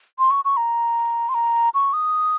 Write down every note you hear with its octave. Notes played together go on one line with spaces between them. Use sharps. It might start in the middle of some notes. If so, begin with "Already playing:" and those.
C6
C#6
C#6
A#5
C6
A#5
C#6
D#6